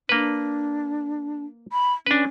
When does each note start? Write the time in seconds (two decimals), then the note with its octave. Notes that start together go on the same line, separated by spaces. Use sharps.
0.09 A#3 D4 B4
1.73 B5
2.06 C#4 D4 B4